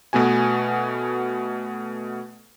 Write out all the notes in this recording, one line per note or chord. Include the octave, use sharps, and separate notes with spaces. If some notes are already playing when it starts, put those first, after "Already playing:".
B2 A3 B3 F#4 G#5